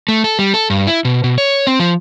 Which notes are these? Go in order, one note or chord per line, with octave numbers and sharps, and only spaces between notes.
A3
A4
G3
A4
G2
E4
B2
B2
C#5
C4
F3